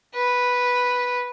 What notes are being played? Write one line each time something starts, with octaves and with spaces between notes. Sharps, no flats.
B4